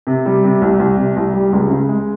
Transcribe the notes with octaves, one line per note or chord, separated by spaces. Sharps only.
C3
G3
C3
C2
C2
C3
C2
G3
C#2
C#3
G#3